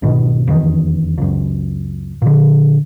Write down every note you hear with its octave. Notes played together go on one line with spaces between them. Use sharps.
C2 G#2 B2 D#3
F1 E2 C3 D#3
C#2 F#2
A#2 D3